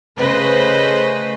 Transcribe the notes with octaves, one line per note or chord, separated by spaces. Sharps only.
C#3 A3 B4 C5 D#5